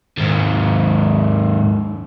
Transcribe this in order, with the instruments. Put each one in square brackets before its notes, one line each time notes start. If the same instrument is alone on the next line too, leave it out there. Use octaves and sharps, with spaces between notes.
[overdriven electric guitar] D#2 G#2